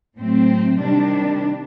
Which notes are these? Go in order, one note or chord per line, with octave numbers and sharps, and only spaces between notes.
A2 F#3 A3 C4
C3 D#3 G3 D4